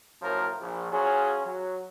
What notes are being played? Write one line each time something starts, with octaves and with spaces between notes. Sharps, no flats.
F#2 A2 F3 F#3 A#4
A#1
F#3 C#4 F4 G#4
F#3